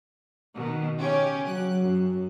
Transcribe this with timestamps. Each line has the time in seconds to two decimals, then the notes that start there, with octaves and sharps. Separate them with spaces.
0.55 B2 D#3
0.97 C#3 C#4 G4
1.48 F#3 F#6
1.80 F#2